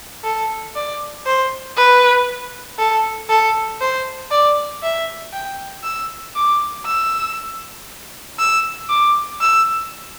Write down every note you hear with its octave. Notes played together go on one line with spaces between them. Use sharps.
A4
D5
C5
B4
A4
A4
C5
D5
E5
G5
E6
D6
E6
E6
D6
E6